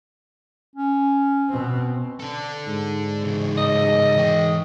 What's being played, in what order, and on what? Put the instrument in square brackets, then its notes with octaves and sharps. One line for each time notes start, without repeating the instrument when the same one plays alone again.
[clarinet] C#4
[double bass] B2 C4
[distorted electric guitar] D3 A4
[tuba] G#2
[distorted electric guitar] E2 C#3
[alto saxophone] D#5
[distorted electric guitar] E3 G5